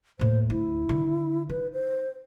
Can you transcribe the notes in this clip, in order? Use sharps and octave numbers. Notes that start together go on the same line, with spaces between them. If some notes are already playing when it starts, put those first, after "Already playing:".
D#2 A2 C5
D2 E4
D3 D#3
D#4 B4
C5